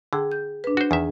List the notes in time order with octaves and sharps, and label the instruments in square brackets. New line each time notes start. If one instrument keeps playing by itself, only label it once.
[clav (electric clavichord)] D3 [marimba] G#4 G5
[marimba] G6
D4 B4
[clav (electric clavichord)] F#4 C5
[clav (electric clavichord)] E2 D#3 E5 [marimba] G#4